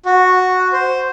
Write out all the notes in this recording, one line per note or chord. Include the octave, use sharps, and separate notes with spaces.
F#4
C5